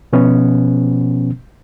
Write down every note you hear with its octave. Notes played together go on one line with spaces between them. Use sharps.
B2 F3 B3 C#4